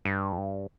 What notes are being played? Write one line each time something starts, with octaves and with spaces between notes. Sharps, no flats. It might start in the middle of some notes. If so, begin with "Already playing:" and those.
G2
F2
G2